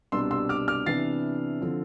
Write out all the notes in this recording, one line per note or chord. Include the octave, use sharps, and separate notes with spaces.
C2 B2 G3 D4 C6 E6
C6 E6
D6 F6
D6 F6
C3 E3 B3 D4 A6 C7
D3 F3 C4